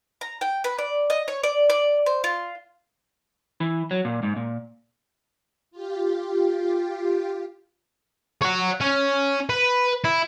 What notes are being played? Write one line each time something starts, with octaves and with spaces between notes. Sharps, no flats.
A#5
G5
B4
D5
D#5
C#5
D5
D5
C5
F4
E3
F#3
A#2
G#2
A#2
F4 G4
C#5 F#5
C#4
B4
E4